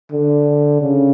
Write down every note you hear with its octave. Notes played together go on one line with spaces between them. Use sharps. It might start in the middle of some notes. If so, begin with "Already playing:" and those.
D3
C#3